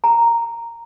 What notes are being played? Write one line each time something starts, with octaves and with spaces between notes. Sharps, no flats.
A#5